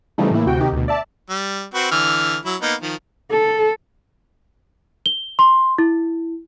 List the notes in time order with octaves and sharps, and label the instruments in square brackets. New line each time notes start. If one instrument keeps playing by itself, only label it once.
[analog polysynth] C#3 E3 F3 G3 A3 D#4
A2 E3 A#3 E4
D2 C3 F#4 G5
C3 D#3 D#4 G4
D2 B2
D5 E5 A5
[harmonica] G3
C4 F#4 B4
D3 E3 F6
F#3 E4
A#3 B3 D#4
D#3 F3
[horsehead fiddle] A4
[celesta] G7
C6
E4